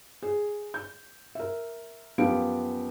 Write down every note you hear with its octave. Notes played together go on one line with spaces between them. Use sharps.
G#4
G6
A#4 E5
F#2 F3 B3 G4 F5 D7